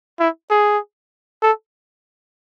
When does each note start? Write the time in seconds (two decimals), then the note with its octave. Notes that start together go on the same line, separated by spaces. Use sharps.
0.19 E4
0.51 G#4
1.42 A4